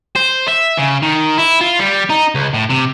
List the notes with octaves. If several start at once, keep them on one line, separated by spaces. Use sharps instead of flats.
C5
E5
C#3
D#3
E4
F4
G3
D#4
C#2
A2
C3